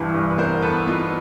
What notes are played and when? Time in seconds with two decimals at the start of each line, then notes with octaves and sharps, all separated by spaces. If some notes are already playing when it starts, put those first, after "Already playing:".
Already playing: C2 G2 E3
0.14 G2
0.30 B4
0.38 B3 A#4 C5
0.62 B3 A4 B4
0.87 B3 D#4 F4